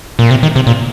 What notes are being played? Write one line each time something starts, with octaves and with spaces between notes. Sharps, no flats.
A#2
C3
D#3
C3
A#2